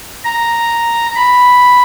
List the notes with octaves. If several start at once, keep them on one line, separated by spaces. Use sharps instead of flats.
A#5
B5